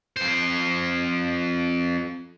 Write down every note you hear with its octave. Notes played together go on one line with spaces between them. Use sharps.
F2 C5